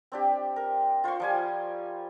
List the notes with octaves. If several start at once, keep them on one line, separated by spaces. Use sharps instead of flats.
C4 D4 G4
A#4
F4 C5 C6 C#6
F3 G3 G#5